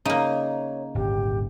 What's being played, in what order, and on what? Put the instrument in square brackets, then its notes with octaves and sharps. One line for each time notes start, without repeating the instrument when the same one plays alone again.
[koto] C#3 A#3 [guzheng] D#4 [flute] C#5
[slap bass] D#1 G#1 D3 [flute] G4